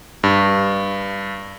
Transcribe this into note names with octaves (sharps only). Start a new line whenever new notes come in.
G2